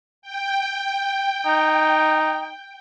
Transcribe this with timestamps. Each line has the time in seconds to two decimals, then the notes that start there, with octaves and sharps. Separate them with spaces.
0.22 G5
1.47 D#4